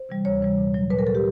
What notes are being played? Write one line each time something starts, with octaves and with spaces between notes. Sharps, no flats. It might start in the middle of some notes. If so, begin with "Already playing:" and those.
Already playing: C5
C3 E3 G3
D2 C#5
C3 E3 G3
A#2
F#3
A#2 B4
A#4
F#3 A4
G4